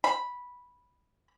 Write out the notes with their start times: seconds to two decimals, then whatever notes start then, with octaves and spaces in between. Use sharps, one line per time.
0.04 B5